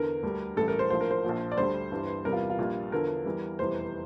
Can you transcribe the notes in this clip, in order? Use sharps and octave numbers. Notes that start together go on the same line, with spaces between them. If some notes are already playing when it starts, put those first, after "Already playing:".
Already playing: E2 D3 A#4
D2 D3 G3
A1 A2 E3 G3 A4
A#4
C5
A#1 A2 F3 C5
A#4
C5
A#1 A#2 F3
D5
D2 D3 G3 C5
G1 G2 E3 G3
E2 C3 G3 A#4
F4
F4
A#1 A#2 G3
E2 D3 F3 A#4
E2 E3 G3
F1 E2 E3 G3 C5